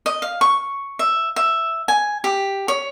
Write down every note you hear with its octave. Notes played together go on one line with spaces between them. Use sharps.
D#5
F5
C#6
E5
E5
G#5
G4
C#5